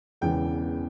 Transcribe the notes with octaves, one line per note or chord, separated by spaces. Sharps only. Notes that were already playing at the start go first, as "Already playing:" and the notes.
E1 E2 C#3 E3 B3 G5